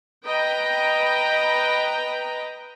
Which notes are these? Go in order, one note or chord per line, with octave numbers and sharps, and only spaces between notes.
B4 D#5 G5 A#5 B5